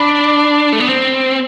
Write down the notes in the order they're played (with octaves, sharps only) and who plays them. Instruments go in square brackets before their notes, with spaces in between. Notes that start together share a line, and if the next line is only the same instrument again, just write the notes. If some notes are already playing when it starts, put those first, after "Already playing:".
Already playing: [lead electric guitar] D4 [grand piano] B5 D6
[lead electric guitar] A3
B3
C4